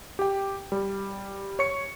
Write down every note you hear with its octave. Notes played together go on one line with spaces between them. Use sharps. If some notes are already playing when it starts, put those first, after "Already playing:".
G4 G5
G3
C#5 C#6 C#7